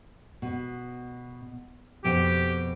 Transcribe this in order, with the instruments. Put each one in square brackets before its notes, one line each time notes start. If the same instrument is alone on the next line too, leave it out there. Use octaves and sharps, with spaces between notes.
[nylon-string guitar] B2
[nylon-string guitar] F2 B2 G5 [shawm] G4